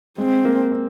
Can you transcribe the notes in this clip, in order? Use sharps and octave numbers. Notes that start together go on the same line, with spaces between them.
G#3 C4
A#3
C4